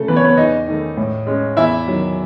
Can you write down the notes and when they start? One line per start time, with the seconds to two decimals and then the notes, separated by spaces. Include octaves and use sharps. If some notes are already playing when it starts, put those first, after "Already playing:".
Already playing: C#3 A3 A4
0.08 E3 B3 B4
0.16 C#5
0.24 B3 B4
0.37 E2 D#4 D#5
0.68 D#3 A3
0.97 A2
1.27 G#3 C#4
1.57 E2 E4 E5
1.87 D#3 F#3